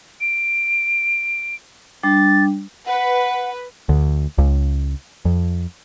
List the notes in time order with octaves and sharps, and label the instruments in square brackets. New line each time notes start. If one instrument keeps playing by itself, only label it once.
[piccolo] D7
[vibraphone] G3 D4 [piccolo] A6
[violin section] B4 [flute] F#5
[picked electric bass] D2
C#2
F2